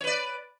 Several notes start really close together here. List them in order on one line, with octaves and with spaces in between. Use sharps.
C#5 B4 D5